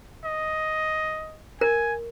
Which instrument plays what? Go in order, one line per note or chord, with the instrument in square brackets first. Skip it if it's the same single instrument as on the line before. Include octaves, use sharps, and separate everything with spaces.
[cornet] D#5
[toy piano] A#4 [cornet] G#5